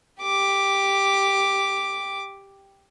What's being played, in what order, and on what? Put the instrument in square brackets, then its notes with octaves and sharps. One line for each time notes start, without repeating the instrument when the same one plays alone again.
[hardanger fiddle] G4 D6